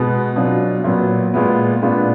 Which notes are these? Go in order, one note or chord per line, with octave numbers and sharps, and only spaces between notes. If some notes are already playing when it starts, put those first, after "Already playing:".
Already playing: B2 G#3 B3
B2 F#3 D4 F4
A#2 F#3 B3
A#2 G#3 B3 F4
A#2 G#3 B3 D4 F4